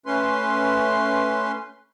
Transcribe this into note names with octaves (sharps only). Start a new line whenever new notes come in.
A3 C#4 B4 C6